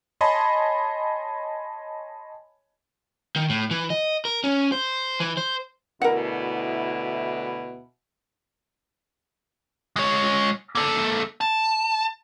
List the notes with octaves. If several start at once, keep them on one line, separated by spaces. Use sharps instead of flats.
C#5 D#5 G#5 A5 B5 C6
D#3
A2
E3
D#5
A#4
C#4
C5
E3
C5
D2 B2 E4 A#4 F#5
G#3 C#5
A#3 A4
A5